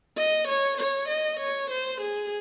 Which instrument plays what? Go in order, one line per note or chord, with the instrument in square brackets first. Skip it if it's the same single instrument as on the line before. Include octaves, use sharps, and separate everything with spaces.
[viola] D#5
C#5
C#5
D#5
C#5
C5
G#4